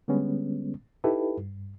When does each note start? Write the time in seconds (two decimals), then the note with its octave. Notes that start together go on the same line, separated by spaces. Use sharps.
0.08 D3 G3 G#3 B3 C#4
1.04 D#4 E4 G4 A4 B4
1.38 G2